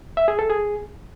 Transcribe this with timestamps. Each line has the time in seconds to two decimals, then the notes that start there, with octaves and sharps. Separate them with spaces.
0.17 E5
0.28 G#4
0.39 A4
0.50 G#4